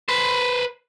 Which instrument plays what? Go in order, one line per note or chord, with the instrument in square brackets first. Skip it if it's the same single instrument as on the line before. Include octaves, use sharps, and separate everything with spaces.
[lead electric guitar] B4 C5